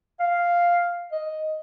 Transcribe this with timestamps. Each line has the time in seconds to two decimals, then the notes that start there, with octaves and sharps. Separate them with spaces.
0.20 F5
1.12 D#5